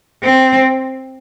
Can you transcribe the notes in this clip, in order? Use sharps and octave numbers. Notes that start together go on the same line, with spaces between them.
C4